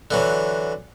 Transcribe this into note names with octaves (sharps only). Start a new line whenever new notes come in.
D3 E3 F#3